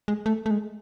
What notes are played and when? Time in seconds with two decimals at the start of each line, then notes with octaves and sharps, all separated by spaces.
0.08 G#3
0.26 A3
0.46 A3
0.51 G#3